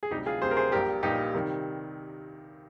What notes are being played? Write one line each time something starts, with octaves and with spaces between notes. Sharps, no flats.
G#4
D2 C3 G3 D#4 G4
F4 G#4
D2 C3 G3 G#4 C5
A#4
G#4 C5
A#1 A#2 G3 G4 A#4
A#1 A#2 G3 D#4 G4
C3 D#3 G3